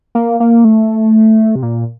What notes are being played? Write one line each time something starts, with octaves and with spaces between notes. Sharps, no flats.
A#3
A#3
A3
C3
A#2